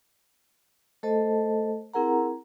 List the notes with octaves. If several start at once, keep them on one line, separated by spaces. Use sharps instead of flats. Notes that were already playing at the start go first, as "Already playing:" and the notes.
A3 A4 C5 D#5 A5
C4 E4 G#4 A#4 F#5 A#5